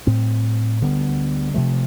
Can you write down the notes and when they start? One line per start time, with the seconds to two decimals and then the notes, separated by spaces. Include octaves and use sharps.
0.06 A2 G3 C4
0.81 D2 D3 G3 B3
1.54 C3 F3 A3